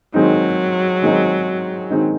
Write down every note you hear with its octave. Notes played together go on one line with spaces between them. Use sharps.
D#3 F#3 G#3 C4 D#4
D#3 G#3 C4 D#4
D#3 G#3 C4 D#4